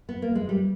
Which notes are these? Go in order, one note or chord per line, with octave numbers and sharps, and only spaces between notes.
B3
A#3
G#3
G3